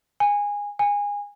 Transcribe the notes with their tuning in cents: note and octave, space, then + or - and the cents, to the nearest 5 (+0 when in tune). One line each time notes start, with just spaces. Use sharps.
G#5 -20
G#5 -25